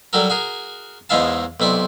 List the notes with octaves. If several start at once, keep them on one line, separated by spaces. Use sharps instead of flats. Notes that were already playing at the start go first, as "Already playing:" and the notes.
F#3 G3 F#4 A4 A#4
F#4 G#4 A#4
E2 G#2 G#3 E4 F5 A5
B1 C3 E4 D5